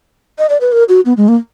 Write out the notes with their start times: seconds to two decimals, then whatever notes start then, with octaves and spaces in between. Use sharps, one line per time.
0.39 D#5
0.49 D5
0.61 B4
0.72 A#4
0.89 F#4
1.06 B3
1.17 G#3
1.28 A#3